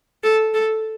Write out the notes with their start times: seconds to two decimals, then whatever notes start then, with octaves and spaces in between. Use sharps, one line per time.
0.23 A4
0.54 A4